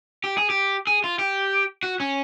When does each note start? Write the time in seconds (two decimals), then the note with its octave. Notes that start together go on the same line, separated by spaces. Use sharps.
0.24 G4
0.38 G#4
0.50 G4
0.87 G#4
1.04 F4
1.19 G4
1.83 F#4
2.00 C#4